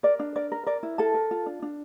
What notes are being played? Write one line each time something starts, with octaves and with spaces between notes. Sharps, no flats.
A#4 D5
D4
A#4 D5
A#4
A#4 D5
E4
A4 A#4 A5
A#4
F4
D4
D4